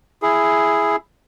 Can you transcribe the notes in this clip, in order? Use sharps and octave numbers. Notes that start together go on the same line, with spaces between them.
E4 G#4